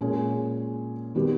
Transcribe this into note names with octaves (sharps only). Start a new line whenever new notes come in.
A#2 G#3 C#4
D#3 G3 B3 G4